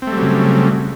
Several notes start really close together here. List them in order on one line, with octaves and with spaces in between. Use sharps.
C4 A3 G3 F#3 C#3